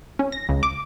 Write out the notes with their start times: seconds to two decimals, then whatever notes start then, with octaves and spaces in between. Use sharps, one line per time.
0.19 C#4
0.32 A#6
0.49 C#2
0.63 D6